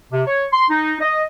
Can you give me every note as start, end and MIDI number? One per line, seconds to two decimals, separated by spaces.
0.12 0.22 48
0.27 0.46 73
0.53 0.65 84
0.70 0.96 63
1.01 1.22 75